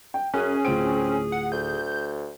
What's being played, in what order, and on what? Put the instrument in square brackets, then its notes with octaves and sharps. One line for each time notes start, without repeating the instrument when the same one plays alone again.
[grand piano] G5
[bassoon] F#2 [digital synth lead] C#4 [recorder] G#4 [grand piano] F#6
[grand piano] D1 F4 D7 [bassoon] C4
[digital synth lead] F#5
[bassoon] D2 [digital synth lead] G6